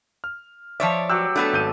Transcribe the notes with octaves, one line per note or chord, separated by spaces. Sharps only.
F6
F3 C#5 D5 E5 A5
F#3 G4 E6 F#6
A3 B3 D4 A4
G#1 G6 D#7